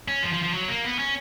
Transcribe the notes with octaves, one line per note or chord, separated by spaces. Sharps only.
C#4
F3
F3
F3
F#3
A#3
B3
C#4